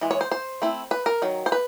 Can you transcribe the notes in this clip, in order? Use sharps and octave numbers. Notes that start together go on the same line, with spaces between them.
E3 G#3
C#5
C5
C5
A3 C4 E4
B4
A#4
D#3 F#3
C5
B4